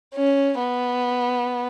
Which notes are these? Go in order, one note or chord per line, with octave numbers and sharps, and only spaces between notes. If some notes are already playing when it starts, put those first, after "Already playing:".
C#4
B3